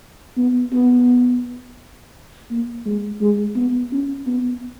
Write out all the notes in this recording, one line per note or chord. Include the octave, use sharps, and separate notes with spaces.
B3
B3
A#3
G#3
G#3
B3
C#4
B3